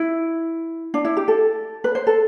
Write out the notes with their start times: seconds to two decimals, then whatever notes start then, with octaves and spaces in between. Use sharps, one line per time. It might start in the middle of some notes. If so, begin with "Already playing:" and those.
Already playing: E4
0.94 D4
1.05 E4
1.17 G4
1.28 A4
1.84 B4
1.95 C5
2.07 A4